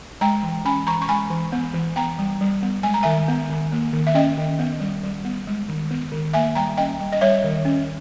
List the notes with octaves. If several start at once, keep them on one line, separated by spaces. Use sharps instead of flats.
G#3 G5 A#5
E3
C#4 G#5 B5
E3 A#5 C#6
C#6
G#3 G#5 B5
E3
B3
E3
B3 G5 A#5
G3
G3
B3
G#3 G#5
A#5
D#3 E5 G#5
B3
D#3
A#3
D#3
E5
C#4 D#5 G5
D#3
B3
G3
G3
B3
G#3
D#3
B3
D#3
A#3 E5 G#5
G3 G5 A#5
C#4 D#5 G5
G3
D#5
G3 C#5 E5
D#3
C#4